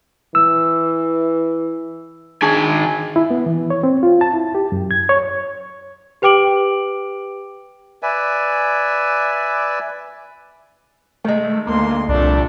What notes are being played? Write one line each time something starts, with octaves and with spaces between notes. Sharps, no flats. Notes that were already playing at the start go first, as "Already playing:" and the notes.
E3 E6
D#3 D4 G#4 G#5 A5
E4
B3
E3
C#5
C4
F4
A5
E4
G4
F#2
G#6
C#5
G4 B4 G5 D6 D7 F#7
B4 D5 E5 G#5
D#3 G#3 A3
D2 A#3 C6
C2 F2 A#2 A3 D4